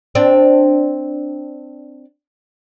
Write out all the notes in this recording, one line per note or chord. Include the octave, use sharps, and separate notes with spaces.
C4 D4